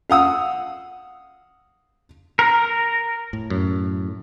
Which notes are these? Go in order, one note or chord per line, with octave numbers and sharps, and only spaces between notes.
F5 F#5 D#6 E6
A#4
A2
F#2